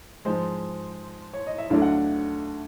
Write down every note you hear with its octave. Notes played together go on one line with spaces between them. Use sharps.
G#2 F3 G#3 C5
C#5
D#5
E5
D2 D3 F#3 A3 D4 F5
F#5